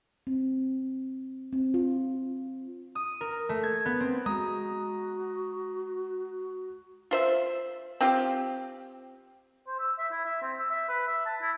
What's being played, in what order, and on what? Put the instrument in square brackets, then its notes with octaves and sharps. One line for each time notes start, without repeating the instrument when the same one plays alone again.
[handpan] C4
C4
F4
[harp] D#6
A#4
A3
G#6
B3
C4
[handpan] G#3 [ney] F#4 [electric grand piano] A#5 D#6
[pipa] F4 C5 E5
C4 F4 G4
[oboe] C5
E6
E5
E4
E5
C4
E6
E5
B4
E5
A5
E4